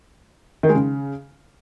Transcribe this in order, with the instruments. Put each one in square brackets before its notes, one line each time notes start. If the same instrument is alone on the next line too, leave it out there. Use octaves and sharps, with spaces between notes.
[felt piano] D#3
G#3
C#3